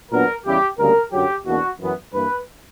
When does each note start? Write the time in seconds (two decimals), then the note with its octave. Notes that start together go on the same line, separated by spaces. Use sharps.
0.11 A#2 F#3 B3 D4 A#4
0.45 E2 C#3 G3 C#4 E4 G4
0.78 D2 C#3 G3 A#3 A#4
1.12 F#2 D3 F#3 G4
1.45 E2 B2 A#3 D4 F#4
1.79 F#2 E3 B3
2.13 G2 E3 A#3 B4